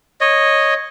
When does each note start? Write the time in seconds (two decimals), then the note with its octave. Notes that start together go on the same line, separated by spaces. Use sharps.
0.21 C#5 D#5